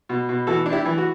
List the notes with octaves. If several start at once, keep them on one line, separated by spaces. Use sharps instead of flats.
B2
B2
E3 F#4 A4
D4
E4 G4
E3
F#4